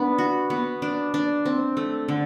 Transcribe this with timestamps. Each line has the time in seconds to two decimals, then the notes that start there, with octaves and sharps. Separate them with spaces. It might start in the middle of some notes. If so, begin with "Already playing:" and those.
Already playing: B3 D4
0.18 F#4
0.50 B3
0.82 D4
1.14 D4
1.46 C4
1.77 A3
2.08 D3